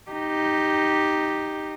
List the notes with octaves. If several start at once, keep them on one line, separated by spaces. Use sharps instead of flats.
D#4 G4